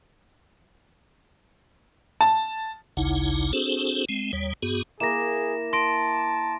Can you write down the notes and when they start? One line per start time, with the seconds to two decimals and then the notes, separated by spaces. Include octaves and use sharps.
2.21 A5
2.97 A1 D2 C#3 D#4 E4 F#5
3.53 C4 D4 F#4 G#4 A4 C5
4.09 G#3 C4
4.33 D#2 G3 C#5
4.63 G2 B3 F#4 G#4
5.00 A#3 E4 G#4 A#6 E7
5.73 A5 C6 A#6 D7